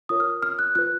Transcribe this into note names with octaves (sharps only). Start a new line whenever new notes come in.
F4 A#4 C#5 D#6
F6
F6
F#6
F4 B4 F#6